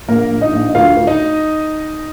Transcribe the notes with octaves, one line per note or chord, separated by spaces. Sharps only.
A#1 A#3 A#4
A#1
D#4 D#5
A#1
D2 F4 F5
D2
D#4 D#5